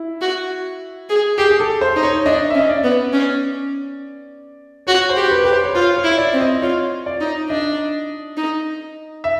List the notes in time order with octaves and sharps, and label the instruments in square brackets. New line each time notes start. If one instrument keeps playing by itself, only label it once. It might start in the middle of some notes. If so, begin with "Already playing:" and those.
Already playing: [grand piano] E4
[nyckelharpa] F#4
G#4
[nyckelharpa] G4 [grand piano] G#4
[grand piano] G#4
A4
C5
[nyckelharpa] D#4
[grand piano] C#5
[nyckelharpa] D4 [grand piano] D#5
[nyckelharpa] C#4 [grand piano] E5
[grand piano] D#5
D5
[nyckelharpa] B3
C#4
[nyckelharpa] F#4 [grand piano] C#5
[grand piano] C5
[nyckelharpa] G4
[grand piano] B4
[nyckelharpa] G4 [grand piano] B4
[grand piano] C5
C#5
[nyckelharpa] F4 [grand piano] C5
[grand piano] C#5
[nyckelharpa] E4
[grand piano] D5
[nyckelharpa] C4
[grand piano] D#5
[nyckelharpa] F4 [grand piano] C#5
[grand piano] D5
[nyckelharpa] D#4
[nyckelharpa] D4 [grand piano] D#5
[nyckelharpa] D#4
[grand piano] E5